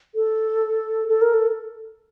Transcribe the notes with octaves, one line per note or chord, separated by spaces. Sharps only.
A4
A4
A#4
A4